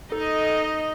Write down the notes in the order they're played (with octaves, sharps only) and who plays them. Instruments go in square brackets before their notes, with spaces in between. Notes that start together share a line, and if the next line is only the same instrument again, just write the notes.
[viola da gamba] D#4 D#5 [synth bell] A4